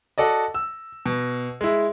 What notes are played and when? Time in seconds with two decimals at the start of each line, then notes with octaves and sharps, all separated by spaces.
0.18 F#4 A4 D5 D#5
0.54 E6
1.06 B2
1.61 G#3 E4